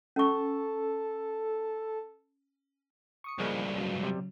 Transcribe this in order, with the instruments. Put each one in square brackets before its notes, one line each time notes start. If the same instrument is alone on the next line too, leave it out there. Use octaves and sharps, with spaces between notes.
[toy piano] C#4 C#6 [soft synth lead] A4
[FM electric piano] C#6 D#6 C#7
[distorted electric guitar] C#2 G2 [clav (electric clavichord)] F3 G#3 A#3
[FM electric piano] C#3 F#3
[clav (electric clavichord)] C3 G3